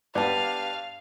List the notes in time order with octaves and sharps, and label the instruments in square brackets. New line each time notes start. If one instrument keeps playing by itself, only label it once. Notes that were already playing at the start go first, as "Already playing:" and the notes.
[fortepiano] G2 B3 [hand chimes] D5 A5 [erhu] F5